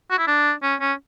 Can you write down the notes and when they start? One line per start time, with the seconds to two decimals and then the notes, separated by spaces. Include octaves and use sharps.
0.11 F#4
0.18 E4
0.27 D4
0.63 C#4
0.81 C#4